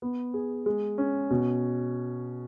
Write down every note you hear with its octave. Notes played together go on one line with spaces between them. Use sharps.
B3
G#4
G#3
C#4
B2